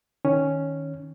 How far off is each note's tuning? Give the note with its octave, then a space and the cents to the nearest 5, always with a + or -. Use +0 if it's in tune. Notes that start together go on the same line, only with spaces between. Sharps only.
D#3 +5 C#4 +0